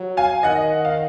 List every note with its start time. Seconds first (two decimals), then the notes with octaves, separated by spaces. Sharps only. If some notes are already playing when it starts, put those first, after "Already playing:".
Already playing: F#3
0.17 F5 G#5
0.43 D#3 D#5 F#5
0.85 F5